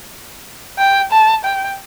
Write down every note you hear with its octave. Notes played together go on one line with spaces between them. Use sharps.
G5
A5
G5